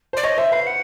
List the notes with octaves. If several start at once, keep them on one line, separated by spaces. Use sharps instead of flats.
C5 D5
C#5 D#5
C5 E5
B4 F5
F#5